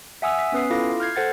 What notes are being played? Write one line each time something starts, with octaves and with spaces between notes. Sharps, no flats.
E5 F#5 G#5 D#6 E6
B6
B3 C#4 B4 D#6 C7
E4 F4 A4 F5 D6 A#6
F6 G6 G#6 C7
A4 C5 F#5 G#6 A6